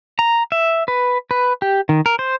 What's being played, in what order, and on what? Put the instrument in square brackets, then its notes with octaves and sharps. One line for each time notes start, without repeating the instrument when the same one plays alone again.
[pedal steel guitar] A#5
E5
B4
B4
G4
D#3
A#4
C5